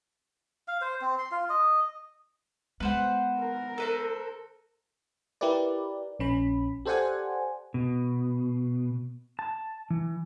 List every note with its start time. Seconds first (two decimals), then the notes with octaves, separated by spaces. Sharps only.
0.68 F5
0.81 C5
1.01 C4
1.18 C6
1.31 F4
1.50 D#5
2.80 G#3 B3 B4 C5 F#5
3.39 A#4
3.78 A4 B4 C5
5.41 E4 G4 A#4 B4 D5
6.19 A#1 C#4 B5
6.85 G4 A4 C5 D5 F#5 G#5
7.74 B2
9.39 A5
9.90 E3